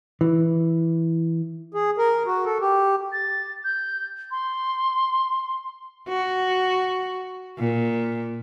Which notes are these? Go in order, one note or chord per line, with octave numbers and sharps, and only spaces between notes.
E3
G#4
A#4
F#4
A4
G4
A6
G6
C6
F#4
A#2